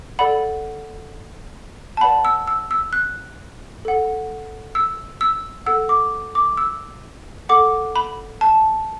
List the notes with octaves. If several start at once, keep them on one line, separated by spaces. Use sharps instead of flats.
A4 D5 F#5 B5
A5
B4 D5 F#5 B5
E6
E6
E6
F#6
A4 F#5
E6
E6
A4 F#5 E6
D6
D6
E6
A4 F#5 D6
B5
A5